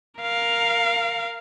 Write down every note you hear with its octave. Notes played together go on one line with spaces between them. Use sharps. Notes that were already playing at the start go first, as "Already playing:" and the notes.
A#4 F5